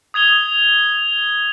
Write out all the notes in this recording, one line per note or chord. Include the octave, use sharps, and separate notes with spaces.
D#6 G#6 F7 G7